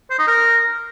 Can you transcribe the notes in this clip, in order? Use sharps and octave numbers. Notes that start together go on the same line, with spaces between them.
C5
D#4
A#4